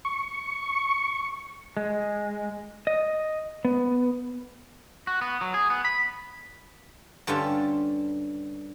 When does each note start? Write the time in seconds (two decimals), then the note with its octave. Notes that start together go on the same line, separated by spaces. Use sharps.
0.05 C#6
1.77 G#3
2.87 D#5
3.65 B3
5.07 F#4
5.21 B3
5.41 F#3
5.54 G#4
5.70 B3
5.85 B5
7.27 G2 D3 C#4 F4 G4 A5